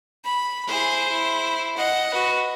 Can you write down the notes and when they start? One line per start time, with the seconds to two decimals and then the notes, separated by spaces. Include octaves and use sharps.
0.25 B5
0.67 E4 G#4 C5
1.07 E4
1.77 D#5 F#5
2.13 F#4 B4